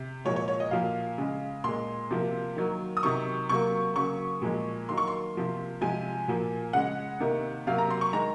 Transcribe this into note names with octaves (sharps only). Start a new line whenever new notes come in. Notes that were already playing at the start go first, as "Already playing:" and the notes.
Already playing: C3
A#2 F3 G#3 C#5
C#5
C#5
D#5
A#2 F3 A#3 F5
C#3 G#3
A#2 G#3 C6
C3 F3 A#3
D#3 F#3 A#3
D#6
C3 D#3 F#3 C#6
C3 F#3 A#3 C#6
C#3 F#3 A#3 C#6
A#2 F3 G#3
D#3 F#3 A#3 C6
C#6
C6
C3 F3 A#3
C3 F3 G#3 G#5
A#2 F3 A#3
C#3 G#3 F#5
C3 D#3 A#3
C3 F#3 A#3 F5
A#5
C6
C#6
D#3 G#3 A#5